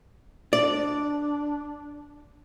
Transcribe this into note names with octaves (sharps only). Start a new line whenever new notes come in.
D4 D5